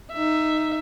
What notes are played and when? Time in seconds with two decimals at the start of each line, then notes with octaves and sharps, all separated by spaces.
0.12 D#4 E5